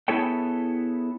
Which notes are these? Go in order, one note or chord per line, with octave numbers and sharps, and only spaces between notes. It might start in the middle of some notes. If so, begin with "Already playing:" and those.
B3 E4 G#4 A4 C#5 G5